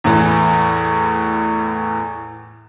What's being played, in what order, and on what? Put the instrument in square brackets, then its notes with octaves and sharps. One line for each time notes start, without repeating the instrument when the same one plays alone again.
[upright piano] E2 A2 E3